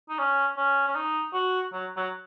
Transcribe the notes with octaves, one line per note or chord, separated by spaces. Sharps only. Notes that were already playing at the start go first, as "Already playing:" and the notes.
D#4
C#4
C#4
C#4
D#4
F#4
F#3
F#3